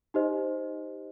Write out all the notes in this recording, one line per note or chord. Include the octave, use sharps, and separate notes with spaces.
D#4 G4 C5 D#5